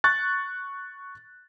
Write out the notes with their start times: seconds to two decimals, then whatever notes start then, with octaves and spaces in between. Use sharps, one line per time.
0.04 C#6 F#6 A6